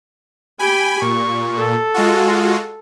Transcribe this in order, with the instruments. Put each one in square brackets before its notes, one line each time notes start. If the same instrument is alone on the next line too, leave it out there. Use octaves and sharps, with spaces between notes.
[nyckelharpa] G4 G5 [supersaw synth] G#5 B5
[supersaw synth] A#2 [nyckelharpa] C#6
[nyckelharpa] A4
[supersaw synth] G#3 F4 F#4